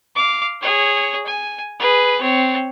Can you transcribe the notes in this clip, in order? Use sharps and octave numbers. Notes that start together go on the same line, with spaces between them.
F5 D6
G#4 C#5
G#5
G#4 B4
C4 C#5